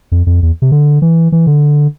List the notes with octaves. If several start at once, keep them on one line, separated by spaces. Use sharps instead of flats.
F2
F2
E2
C3
D3
E3
E3
D3